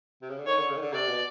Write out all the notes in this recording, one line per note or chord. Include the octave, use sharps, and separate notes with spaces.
C3
C#3
D3
D#3 C#5
D3
C#3
D#3
D3
C3 D5
B2